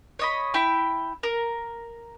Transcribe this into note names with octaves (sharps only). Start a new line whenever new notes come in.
C#5 D#5 B5
E4 G5 B5
A#4